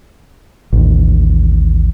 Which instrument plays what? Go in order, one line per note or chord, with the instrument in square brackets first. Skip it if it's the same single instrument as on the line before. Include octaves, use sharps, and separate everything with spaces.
[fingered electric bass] A1 D#2